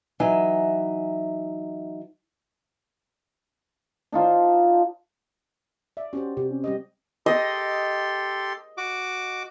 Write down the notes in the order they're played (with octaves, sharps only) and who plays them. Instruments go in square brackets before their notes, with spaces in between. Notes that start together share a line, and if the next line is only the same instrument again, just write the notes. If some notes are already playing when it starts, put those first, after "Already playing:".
[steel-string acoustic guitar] E3 F#3 D#4 E5 G#5
[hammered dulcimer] D4 D#4 F4 C5
[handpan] D5 [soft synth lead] E5
[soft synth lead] C#4 [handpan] F#4 G4 C5
[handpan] C3 [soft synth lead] G4
[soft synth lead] C#4
[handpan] G3 G4 D#5
[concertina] G4 A4 C6 [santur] D#5
[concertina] F#4 D6